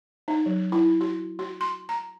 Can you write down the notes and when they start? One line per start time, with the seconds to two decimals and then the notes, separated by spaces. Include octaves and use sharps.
0.28 D#4
0.46 F#3
0.72 E4
1.01 F#4
1.39 F#4
1.61 C6
1.89 A#5